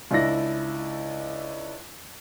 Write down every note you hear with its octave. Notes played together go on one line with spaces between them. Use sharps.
C#2 D4 E4 A#6